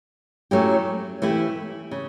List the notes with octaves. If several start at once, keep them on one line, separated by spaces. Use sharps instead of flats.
F#3 A3 C#4 E4 G4
E3 A3 E4 G4
C#3